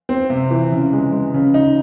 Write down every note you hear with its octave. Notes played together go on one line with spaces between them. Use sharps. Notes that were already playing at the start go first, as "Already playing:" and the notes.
C4
C3
E3
C#3
G#3
G#3
C#3
D#4